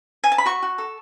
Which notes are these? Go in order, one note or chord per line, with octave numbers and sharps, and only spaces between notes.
G#5
A5
B5
F#4 C#6
F#4
A4